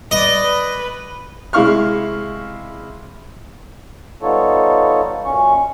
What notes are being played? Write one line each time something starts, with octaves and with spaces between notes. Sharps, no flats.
B4 D5 D#5
B4
C3 G#3 E4 F5 C#6 F6
G3 B3 D#4 F4 A4 C#5
F#2 A#2 C#4 C#6